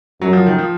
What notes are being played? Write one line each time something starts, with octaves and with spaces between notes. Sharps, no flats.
F#2 F#3
F3
D#3
F3